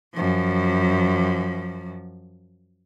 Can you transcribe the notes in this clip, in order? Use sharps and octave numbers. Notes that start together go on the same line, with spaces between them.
F#2 F3